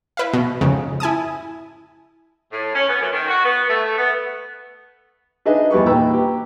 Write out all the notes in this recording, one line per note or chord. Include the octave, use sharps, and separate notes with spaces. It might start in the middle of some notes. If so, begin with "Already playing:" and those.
E4 B4 E5 F5
B2
F2 G#2 C#3
E4 G#5 A5 D#6
A2
C#4
B3
F#2
D#3
F#4
B3
A3
B3
D4 D#4 G#4 B4 D#5 E5
E2 G3 B4 C#6
A#2 D#4 B4 G5 A#5 E6
G4